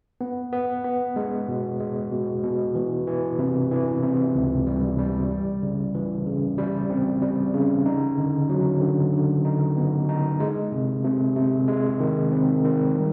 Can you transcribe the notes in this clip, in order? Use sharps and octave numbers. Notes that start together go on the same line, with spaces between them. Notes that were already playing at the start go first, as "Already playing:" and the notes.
B3
B3
B3
G#3
B2
G#3
B2
B2
E3
E3
C3
E3
C3
C#2
G3
G3
G3
C#3
E3
C#3
G3
C4
G3
C#3
D#4
D3
F#3
D3
D3
D#4
B3
D#4
G#3
C3
C3
C3
G#3
D#3
C4
D#3
G3